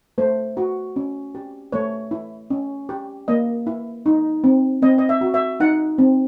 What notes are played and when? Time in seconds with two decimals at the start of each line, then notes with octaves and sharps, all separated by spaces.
0.18 A3 C5
0.57 F#4
0.96 C#4
1.35 G4
1.72 A3 C#5
2.11 E4
2.50 C#4
2.89 G4
3.28 A#3 D#5
3.67 E4
4.06 D#4
4.44 C4
4.82 C4 D#5
4.98 D#5
5.09 E5
5.21 F#4
5.34 E5
5.60 D#4 F#5
5.98 C4